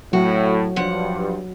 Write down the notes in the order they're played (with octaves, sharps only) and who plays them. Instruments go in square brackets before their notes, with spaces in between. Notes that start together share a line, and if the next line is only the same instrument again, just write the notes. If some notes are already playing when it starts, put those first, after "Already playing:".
[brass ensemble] A2 [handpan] F#3 [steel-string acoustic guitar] F#4
[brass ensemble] G2 [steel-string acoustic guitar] F3 F#5